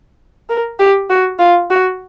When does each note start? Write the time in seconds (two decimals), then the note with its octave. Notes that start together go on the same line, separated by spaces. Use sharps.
0.49 A#4
0.79 G4
1.09 F#4
1.39 F4
1.70 F#4